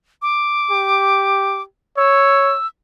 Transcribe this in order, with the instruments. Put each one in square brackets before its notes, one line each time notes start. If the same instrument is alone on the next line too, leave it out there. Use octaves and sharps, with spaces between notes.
[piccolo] D6
[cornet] G4
[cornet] C#5 [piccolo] E6